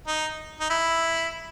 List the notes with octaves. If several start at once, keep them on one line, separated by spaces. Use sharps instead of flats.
D#4
D#4
E4